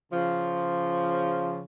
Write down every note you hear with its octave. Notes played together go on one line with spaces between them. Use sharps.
C#3 F3